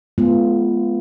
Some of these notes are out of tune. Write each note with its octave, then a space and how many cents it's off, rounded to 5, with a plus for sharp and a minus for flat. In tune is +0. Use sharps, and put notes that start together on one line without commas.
G#3 +45 B3 +0 F4 -20